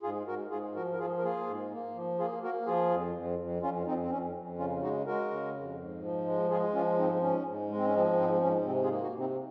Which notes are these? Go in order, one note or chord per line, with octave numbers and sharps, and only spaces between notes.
G#2 F4 G#4
G#2 F#4 A#4
G#2 F4 G#4
F3 F#4 A#4
A#4
F3 F4 G#4
A#4
A#3 F4 G#4
G#2
A#3
F3
A#3 F4 G#4
A#3 F#4 A#4
F3 F4 G#4
F2
F2
F2
F2 C#4 F4
F2 C4 D#4
C4
F2 C#4
F2
C#3 C#4 F4
G#3 D#4 F#4
G#3 F#4 A#4
C#3
F2
G#2
F3
G#3
G#3 F4 G#4
F3 C#4 F4
G#2 C4 D#4
G#2 C#4
G#2
G#3
C4
C#4
F3 C4 D#4
G#2 C4 D#4
G#2 C#4
C3 C4
F4 G#4
A#3
D#4 F#4
C3
C4 D#4